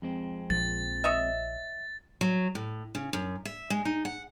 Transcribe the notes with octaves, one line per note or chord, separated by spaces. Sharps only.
F2 G#3 C4
A#1 F3 A6
C#5 D#5 E5
F#3
A2
C#3
F#2
E5
G#3
D#4
F#5